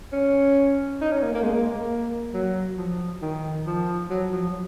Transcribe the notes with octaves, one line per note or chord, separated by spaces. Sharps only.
C#4
D#4
C#4
A#3
A#3
G#3
A#3
F#3
F3
D#3
F3
F#3
F3
F#3